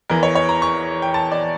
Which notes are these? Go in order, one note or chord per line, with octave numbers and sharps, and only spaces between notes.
E2 E3 A#4
C#5
C#5
A#5
C#6
G5
A5
D5